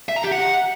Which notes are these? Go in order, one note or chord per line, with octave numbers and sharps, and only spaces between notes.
E5
A#5
G4
F#5